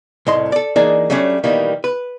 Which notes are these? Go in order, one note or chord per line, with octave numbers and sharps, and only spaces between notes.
C2 A2 D#5 C6
A4 D5
E3 A#3 D4 D#4 G#4 D5
F#3 G3 A3 C#4 D4
B2 D#3 E3 G3 A#3
B4